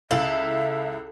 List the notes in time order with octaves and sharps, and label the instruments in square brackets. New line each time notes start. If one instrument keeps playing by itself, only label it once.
[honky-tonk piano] C#2 E4 F#7 [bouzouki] A4 [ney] E5 [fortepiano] F5